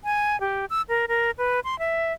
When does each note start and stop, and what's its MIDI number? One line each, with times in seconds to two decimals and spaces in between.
0.04 0.39 80
0.41 0.66 67
0.70 0.82 88
0.89 1.06 70
1.08 1.31 70
1.38 1.60 71
1.64 1.78 84
1.79 2.13 76